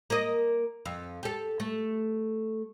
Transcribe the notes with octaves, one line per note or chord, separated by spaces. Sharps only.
A#3 D#5
F2
G4 A4
A3